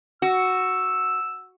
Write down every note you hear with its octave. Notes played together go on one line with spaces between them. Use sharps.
F#4 E6